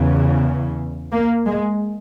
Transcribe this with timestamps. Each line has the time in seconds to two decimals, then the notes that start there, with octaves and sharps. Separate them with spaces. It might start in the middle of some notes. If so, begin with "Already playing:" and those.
Already playing: E2 C#3
1.11 A#3
1.46 G#3